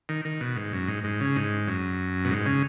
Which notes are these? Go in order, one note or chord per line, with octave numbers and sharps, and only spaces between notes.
D#3
D#3
B2
G#2
F#2
G#2
G#2
C#3
G#2
F#2
B2
G#2
C#3